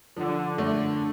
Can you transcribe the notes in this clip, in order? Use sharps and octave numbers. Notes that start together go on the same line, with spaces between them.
D3 F3
D3 A3